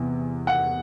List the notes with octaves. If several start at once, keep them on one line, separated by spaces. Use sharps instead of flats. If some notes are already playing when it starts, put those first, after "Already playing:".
Already playing: E2 C3
F#5